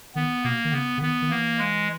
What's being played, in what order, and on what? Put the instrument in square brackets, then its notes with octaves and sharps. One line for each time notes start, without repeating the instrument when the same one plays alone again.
[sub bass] D#3 [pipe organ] B3
[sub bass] B2 [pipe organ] A#3
[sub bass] D#3
[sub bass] C#3 [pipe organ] B3
[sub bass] C#3
[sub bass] D#3 [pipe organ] B3
[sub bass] D#3
[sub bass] E3 [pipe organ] A#3
[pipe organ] G#3